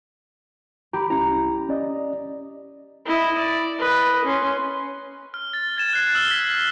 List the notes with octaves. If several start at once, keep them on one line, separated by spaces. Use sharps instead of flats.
G4 A#5 B5
C2 C#4 E4 A#5
C#4 D5 D#5
E4 D#5
D5
B4 D#5
C#4 C6
F6
A6
G#6 A6 E7
F#6 G#6 C7
E6 F6 G7
B6